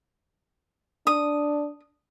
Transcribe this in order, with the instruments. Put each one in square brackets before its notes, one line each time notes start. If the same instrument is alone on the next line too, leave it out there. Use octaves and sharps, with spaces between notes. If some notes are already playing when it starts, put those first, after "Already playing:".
[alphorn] D4 [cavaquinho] D#6